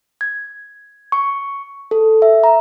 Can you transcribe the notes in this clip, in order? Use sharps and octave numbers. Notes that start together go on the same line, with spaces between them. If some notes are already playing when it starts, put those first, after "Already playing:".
G#6
C#6
A4
E5
A#5